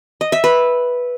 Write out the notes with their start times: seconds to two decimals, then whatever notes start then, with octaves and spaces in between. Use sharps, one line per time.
0.21 D#5
0.32 E5
0.44 B4